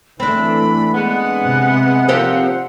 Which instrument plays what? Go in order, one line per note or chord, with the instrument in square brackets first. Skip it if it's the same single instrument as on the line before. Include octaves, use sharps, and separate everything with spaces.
[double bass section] E3 A3 [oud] C4 D4 [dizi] B5
[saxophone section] G#3 B3 [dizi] F#5
[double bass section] C3
[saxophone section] A#2 D#3 F3 [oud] C4 G4 C5